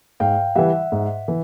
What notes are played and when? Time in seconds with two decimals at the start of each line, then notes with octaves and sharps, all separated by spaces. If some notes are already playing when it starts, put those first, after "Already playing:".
0.20 G#2 F5 G5
0.56 E3 G3 E5 F#5
0.92 G#2
1.28 E3